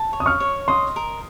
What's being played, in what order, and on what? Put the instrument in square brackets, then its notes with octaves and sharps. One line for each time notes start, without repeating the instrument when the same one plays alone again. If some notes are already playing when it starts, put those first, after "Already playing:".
Already playing: [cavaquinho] A5
C#5
[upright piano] D#6
C#6 F6
[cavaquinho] C#5
[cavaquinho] D#5 [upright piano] C6 D#6
[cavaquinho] A#4